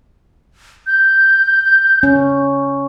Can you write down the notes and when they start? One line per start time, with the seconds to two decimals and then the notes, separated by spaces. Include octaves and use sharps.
0.87 G6
2.03 C#4